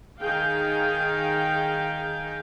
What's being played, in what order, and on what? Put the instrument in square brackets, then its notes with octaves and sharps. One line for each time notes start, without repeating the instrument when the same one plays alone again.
[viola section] D#3 G#4 F5 G5